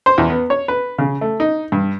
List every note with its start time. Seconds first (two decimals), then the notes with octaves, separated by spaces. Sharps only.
0.06 C5
0.18 E2
0.30 B3
0.50 C#5
0.68 B4
0.98 C#3
1.21 A3
1.40 D#4
1.72 G2